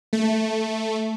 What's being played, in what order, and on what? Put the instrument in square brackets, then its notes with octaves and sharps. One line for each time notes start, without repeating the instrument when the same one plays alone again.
[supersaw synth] A3